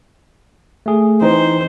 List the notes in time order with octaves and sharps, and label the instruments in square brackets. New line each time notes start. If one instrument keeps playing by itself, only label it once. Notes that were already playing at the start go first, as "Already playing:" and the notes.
[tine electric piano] A3 G#4
[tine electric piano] E3 C4 D#4 [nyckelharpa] C5